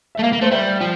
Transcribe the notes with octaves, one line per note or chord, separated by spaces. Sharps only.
E5
A3
A#3 F5
A#3
A3 C5
G3 E5
F3 G5